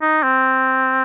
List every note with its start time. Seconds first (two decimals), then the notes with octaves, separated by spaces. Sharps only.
0.02 D#4
0.23 C4